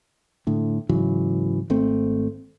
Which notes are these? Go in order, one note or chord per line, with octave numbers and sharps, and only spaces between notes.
A2 D3
G#2 C#3 E3 F#3
G#1 A3 C4